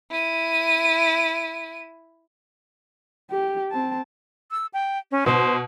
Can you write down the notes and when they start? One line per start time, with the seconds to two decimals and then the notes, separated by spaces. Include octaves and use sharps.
0.11 E4 D#7
3.31 G4
3.72 C4 A5
4.51 E6
4.73 G5
5.11 C#4
5.26 B2 C5